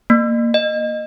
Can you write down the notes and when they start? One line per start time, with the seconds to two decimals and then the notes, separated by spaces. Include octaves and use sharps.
0.10 A#3
0.54 D#5